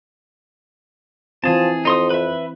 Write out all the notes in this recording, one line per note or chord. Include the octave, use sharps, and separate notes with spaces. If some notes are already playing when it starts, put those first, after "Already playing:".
E3 F3 C4 G#4 A5
F2 D#4 C6 D#6
B4 E5